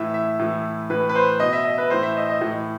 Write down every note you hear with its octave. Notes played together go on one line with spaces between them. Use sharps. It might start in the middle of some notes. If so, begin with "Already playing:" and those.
Already playing: A2 E3 E5
E5
A2 E3
A2 E3 B4
B4
C5
B2 D#5
E5
D#5
B4
A2 E3 C5
E5
D#5
D#5
A2 E3